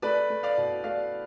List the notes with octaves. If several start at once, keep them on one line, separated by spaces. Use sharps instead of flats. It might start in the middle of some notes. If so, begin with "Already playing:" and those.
A3 B4 D5
A3
D5 F5
B2
A3 D5 F5